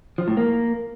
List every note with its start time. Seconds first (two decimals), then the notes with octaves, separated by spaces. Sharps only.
0.18 F3
0.28 A2
0.37 A#3